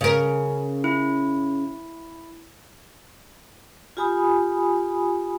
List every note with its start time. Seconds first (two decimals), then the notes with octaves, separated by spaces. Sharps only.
0.01 C#3 A#4
0.84 E4
3.97 F4 G4 G#5 B5 D#6